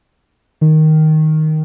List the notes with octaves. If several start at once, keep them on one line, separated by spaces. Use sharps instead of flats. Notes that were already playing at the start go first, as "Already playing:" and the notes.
D#3